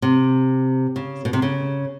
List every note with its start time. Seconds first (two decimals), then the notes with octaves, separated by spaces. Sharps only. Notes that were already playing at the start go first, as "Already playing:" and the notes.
0.02 C3
0.96 C#3
1.25 B2
1.33 C3
1.42 C#3